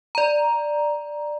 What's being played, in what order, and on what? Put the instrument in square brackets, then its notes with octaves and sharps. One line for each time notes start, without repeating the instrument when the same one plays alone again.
[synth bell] D5 A#5